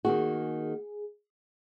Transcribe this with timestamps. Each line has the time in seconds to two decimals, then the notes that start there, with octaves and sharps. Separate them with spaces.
0.05 D#3 A#3 F#4 G#4